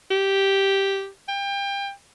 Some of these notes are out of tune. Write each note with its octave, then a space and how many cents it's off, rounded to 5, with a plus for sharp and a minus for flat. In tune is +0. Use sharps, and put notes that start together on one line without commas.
G4 -5
G5 +30